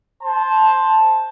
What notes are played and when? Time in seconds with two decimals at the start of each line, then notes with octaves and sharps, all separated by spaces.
0.22 C5 A5